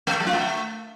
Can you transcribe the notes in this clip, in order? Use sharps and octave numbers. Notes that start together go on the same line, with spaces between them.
A3
A#4
F#3
F4
A3